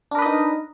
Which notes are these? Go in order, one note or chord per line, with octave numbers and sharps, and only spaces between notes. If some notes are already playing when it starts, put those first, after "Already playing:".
D4 D#4 A#4 B4 D#5